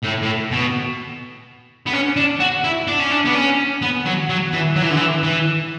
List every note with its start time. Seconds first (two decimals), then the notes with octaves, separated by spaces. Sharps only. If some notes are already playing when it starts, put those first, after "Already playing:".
0.03 A2
0.23 A2
0.51 B2
1.86 B3
1.93 C#4
2.16 D4
2.40 F#4
2.64 E4
2.87 D4
3.00 C#4
3.11 D4
3.25 B3
3.35 C#4
3.82 B3
4.06 F#3
4.29 F#3
4.53 E3
4.76 F#3
4.82 E3
4.90 D3
4.97 E3
5.23 E3